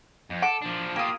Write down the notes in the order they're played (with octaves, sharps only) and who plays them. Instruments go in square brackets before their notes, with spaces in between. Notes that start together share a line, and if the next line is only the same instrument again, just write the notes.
[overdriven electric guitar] F2
[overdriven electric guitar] A4 [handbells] F#5 [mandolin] D6
[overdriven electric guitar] F3 D4
[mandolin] A#3 D#6 [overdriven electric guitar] F4 G4